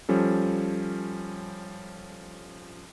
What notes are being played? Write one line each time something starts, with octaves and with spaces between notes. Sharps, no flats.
F3 G3 C#4 A4